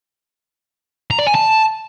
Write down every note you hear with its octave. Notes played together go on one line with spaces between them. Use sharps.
A#5
D5
G#5
A5